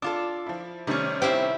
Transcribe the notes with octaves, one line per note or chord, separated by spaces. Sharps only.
D4 F4 A4 D6
F3 E4
C3 D#3 G3 A3 C#4
C4 E4 G4